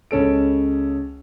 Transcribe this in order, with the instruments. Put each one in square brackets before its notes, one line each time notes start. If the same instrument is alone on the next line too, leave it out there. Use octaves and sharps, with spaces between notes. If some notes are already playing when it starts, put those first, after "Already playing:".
[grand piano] C#2 C#3 C#4 A4 D7